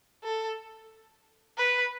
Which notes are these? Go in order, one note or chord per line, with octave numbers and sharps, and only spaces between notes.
A4
B4